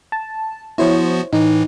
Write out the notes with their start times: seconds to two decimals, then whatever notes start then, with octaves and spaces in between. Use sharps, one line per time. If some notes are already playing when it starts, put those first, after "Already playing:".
0.12 A5
0.78 F3 B3 E4 F#4 C5 C#5
1.33 A2 E3 D#4